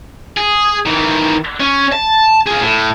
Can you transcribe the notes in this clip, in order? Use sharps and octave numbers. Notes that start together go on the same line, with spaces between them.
G#4
D#3 E3
C#4
A5
F4 G#4
A2